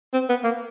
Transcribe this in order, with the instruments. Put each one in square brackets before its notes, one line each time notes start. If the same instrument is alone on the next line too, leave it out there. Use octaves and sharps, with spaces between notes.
[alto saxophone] C4
B3
A#3